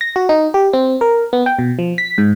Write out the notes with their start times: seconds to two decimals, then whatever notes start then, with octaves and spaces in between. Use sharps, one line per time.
0.01 A#6
0.16 F#4
0.29 D#4
0.54 G4
0.73 C4
1.01 A#4
1.33 B3
1.46 G5
1.59 B2
1.79 F3
1.98 B6
2.18 G#2